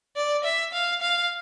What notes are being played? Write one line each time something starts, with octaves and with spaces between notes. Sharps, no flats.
D5
E5
F5
F5